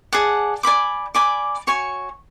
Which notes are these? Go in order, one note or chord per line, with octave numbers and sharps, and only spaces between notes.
G#4 D5 F#5 A5
D5 G#5 B5 D6
D5 G#5 B5 D6
F#4 C#5 G#5 C#6